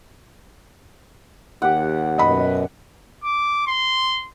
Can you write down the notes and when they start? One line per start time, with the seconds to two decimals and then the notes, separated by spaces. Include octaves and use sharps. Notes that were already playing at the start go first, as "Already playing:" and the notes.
1.62 D#2 G4 F#5
2.18 F#2 B2 D#5 B5
3.24 D6
3.67 C6